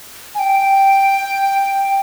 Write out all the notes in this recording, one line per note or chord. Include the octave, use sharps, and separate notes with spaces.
G#5
G5